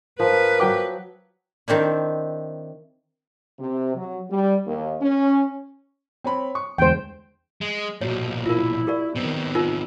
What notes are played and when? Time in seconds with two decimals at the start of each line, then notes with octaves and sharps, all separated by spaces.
0.20 F3 A#4 B4
0.60 F#3 G5 D6
1.68 D#3 C4 D4 E4
3.59 C3
3.95 F#3
4.30 G3
4.66 D#2
5.01 C#4
6.24 C4 C#5 B5
6.55 C#6
6.78 E2 D3 G#3 C5 G5
7.61 G#3
8.01 B1 A#2 F#4 C#5
8.46 E4 F4 A#4
8.87 G4 A#4 D5
9.16 C3 D#3 F#3 B3
9.55 D#4 F4 A#4